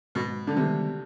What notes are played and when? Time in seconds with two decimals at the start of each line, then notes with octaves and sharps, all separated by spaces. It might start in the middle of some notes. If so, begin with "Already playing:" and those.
0.15 G#2 B2
0.47 D3
0.56 C3 D#3 G3 B3